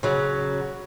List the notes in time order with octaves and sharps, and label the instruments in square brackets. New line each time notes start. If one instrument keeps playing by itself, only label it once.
[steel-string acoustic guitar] C#3 F#3